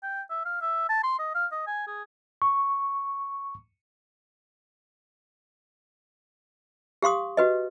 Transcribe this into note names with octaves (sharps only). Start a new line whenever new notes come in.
G5
E5
F5
E5
A5
C6
D#5
F5
D#5
G#5
G#4
C#6
G4 F5 C6 D#6
F#4 B4 D#5